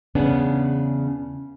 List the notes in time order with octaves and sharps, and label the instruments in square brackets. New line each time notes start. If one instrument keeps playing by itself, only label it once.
[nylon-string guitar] E2 C#3 B3 C#4 D4